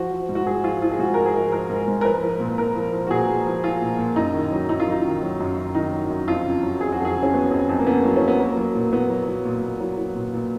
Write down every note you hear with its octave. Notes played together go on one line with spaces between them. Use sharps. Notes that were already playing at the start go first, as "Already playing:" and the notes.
Already playing: F3 F#4
F3
G#2
F#4
G#2 G#4
F3 F4
F3 F4
G#4
G#2 F#4
G#2 A#4
G#4
F3
F3 A#4
G#2
G#2
A#4
F3 B4
F3
A#2
A#2 A#4
F3
F3
F#4
A#2 G#4
A#2
F3
F3 F4
A#2
A#2
F#2 D#4
D#3
F#3
F#2 D#4
F4
F#2 D#4
D#3
F#3
F#2
F#2
D#3 D#4
F#3
F#2
F2 F4
C#3
F#3
F2 G#4
F#4
F2
G#4
C#3
C#4
F#3 B3
F2
F2
A#3
C#3 B3
F#3
F2 C#4
B3
F#3 A#3
F#3
A#2
A#2 B3
F#3
F#3
A#2
A#2
F#3
F#3
A#2
A#2